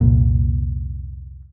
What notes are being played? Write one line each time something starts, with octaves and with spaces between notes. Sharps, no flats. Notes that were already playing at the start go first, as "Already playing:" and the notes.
C2 F2 A#2